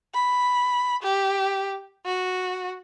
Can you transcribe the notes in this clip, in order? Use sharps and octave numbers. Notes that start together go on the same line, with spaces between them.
B5
G4
F#4